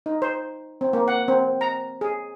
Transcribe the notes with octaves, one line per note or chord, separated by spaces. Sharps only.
D#4
C5
C4
A#3
F#5
C4
A#5
G#4